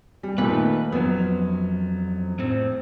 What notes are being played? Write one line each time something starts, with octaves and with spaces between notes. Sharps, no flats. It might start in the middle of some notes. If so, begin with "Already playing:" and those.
G3
A#2 D#3 A3 B4
F2 F#3 B3
A2 C4